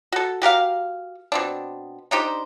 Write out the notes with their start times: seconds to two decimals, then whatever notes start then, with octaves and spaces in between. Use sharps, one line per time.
0.12 F#4 A4
0.42 F#4 G4 A#4 F5
1.32 B2 C4 D4
2.11 D4 D#4 G4 C5